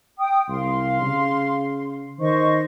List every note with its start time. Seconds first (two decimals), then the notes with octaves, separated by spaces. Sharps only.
0.18 G5 D#6
0.48 C2 F5 C6
1.02 C#3
2.20 D#3 C5 D#5 C#6